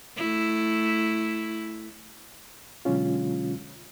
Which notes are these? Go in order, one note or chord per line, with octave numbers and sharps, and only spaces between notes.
A3 E4
B2 D3 F#3 G#3 C#4 F4